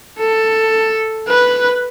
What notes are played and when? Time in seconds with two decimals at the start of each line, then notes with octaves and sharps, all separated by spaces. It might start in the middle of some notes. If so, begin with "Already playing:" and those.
0.19 A4
1.28 B4